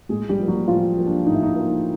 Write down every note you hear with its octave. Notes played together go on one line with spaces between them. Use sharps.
A2 G#3 G#4
G3 G4
F3 A#3
F#3 F#4
A2 F3 F4
F3 A#3
D4
A2 D#4
E4
D#4
F3 A#3